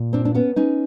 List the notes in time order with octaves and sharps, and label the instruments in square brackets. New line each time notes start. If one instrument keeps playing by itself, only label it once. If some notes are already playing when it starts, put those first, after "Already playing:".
Already playing: [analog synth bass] A#2
[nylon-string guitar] C4 D4
D4
B3 C#4
C#4 D#4